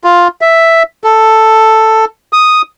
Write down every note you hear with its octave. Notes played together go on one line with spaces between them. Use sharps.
F4
E5
A4
D#6